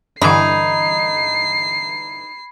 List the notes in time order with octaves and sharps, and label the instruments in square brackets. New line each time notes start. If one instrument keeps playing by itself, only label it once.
[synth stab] G2 D3 E3 [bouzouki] D#4 [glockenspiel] B5 G#6 [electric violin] C7